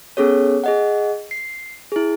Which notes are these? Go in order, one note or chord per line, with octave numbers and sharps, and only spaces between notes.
B3 C#4 G#4 A4 C#5
G#4 D#5 F#5
C7
E4 G#4